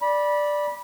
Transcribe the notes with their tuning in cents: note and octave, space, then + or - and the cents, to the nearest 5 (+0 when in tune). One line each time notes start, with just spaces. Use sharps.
D5 +0 B5 -20